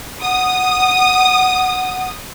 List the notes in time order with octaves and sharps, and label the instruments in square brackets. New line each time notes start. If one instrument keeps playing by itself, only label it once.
[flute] F#5 [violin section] D#6